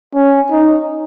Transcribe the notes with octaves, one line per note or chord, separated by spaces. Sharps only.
C#4
D#4